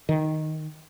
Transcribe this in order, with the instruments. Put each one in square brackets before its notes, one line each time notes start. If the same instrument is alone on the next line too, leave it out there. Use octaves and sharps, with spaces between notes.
[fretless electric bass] D#3